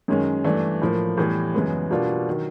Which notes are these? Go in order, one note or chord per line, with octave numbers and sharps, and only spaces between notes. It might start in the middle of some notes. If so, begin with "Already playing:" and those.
F#2 D#3 G#3 C#4
G2 E3 A3 D4
A2 F3 A#3
A2 E3 G3 B3
F#2 C#3 E3 G#3 B3
B2 G3 A#3 D4 F4
D#3 F#3